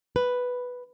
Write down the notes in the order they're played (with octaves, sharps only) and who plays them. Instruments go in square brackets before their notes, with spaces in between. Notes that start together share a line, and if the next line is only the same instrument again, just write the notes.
[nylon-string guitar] B4